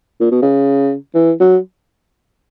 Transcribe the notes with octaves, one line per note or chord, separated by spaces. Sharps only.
A#2
B2
C#3
E3
F#3